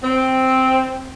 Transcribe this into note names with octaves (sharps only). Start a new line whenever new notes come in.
C4